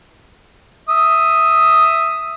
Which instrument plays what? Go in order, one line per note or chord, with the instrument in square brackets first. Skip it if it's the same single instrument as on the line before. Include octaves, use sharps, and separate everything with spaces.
[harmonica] E5 D#6